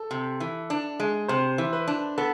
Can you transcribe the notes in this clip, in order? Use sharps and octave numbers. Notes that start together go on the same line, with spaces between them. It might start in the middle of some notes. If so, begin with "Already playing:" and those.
Already playing: A4
C3
E3
D4
G#3
C3 C5
E3
B4
D4
B3 A4